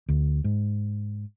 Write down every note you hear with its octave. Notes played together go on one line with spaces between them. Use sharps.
D2
G#2